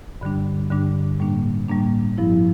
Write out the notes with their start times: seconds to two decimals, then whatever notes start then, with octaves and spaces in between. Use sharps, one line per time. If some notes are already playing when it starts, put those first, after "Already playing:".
0.21 G2 D3 G3 D4
0.70 G2 D3 G3 D4
1.20 A2 G3 A#3 D4
1.69 A2 G3 A#3 D4
2.18 G2 F3 C4 E4